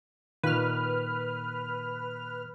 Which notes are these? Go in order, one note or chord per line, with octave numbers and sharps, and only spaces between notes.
A#2 D#3 A#3 B4 F6